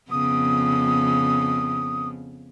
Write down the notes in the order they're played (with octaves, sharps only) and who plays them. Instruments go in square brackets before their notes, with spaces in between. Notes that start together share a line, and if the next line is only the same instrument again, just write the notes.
[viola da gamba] F2 C#3 B3 [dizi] D#6